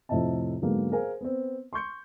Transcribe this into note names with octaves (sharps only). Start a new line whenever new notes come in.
F2 A2 C3 D#5 E5 A5
G#2 D3 F#3 G#3 A#3 B3
G#4 A#4 C5 F5 G#5
B3 C4
C6 C#6 G6 C#7